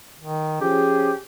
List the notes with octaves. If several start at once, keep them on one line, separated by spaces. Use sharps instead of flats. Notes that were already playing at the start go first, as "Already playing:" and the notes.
D#3
F3 C#4 G4 G#4